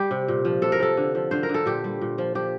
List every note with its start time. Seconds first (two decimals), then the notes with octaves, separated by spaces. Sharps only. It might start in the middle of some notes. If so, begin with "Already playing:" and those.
Already playing: G3 G4
0.11 C3
0.28 A#2
0.45 F3
0.62 C3 A4
0.72 A#4
0.79 F3 A4
0.97 D3
1.15 F3
1.31 D3 C5
1.43 A#4
1.49 D3
1.54 A4
1.66 A#2 G4
1.84 G3
2.01 A#2
2.18 F3
2.35 F3 G4